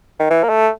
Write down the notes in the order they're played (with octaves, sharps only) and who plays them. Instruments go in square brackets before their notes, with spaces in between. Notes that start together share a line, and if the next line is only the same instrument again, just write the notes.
[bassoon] D#3
E3
A#3
A3